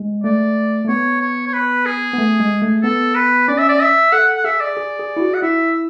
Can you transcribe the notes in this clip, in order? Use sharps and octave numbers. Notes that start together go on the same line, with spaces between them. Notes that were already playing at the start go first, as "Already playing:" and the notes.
Already playing: G#3
A3 D5
A3
B3 C#5
C#5
C#5
B4
G#4
B3
A3
G#3
A3
B3 A4
B4
C#4 D5
E5
D5
E5
A4 F#5
F#5
G#4 E5
D5
G#4
G#4
E4
F#4
F#5
E4 E5